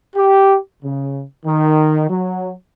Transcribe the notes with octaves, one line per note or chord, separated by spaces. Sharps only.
G4
C#3
D#3
F#3